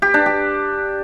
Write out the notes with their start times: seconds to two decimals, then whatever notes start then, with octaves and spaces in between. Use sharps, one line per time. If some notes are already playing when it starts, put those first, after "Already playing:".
0.02 G4
0.14 D4
0.26 G4